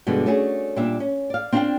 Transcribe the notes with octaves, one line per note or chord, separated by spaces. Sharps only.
G2 B2 D3 E3 G#3
A3 C#4 D4 F#4 G#4
A#2 G3 D4 E5
C#4
D5 F5
C4 D4 F4 C5 F5 G5